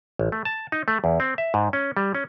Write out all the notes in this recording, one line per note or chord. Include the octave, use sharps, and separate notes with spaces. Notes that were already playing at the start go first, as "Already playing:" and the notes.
A1
A3
A5
D#4
A3
E2
C4
E5
G#2
C#4
G3
C#4